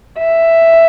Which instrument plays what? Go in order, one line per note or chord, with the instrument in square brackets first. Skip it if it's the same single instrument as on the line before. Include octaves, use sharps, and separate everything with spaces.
[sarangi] E5